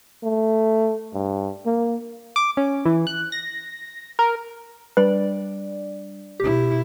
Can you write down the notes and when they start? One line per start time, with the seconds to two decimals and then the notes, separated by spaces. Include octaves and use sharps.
0.24 A3
1.14 G2
1.66 A#3
2.36 D6
2.57 C#4
2.85 E3
3.07 F#6
3.32 A#6
4.19 A#4
4.97 G3 D4 B4 D5
6.40 B2 E4 G4